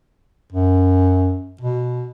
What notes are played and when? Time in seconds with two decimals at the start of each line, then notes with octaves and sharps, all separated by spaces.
0.53 F#2
1.61 B2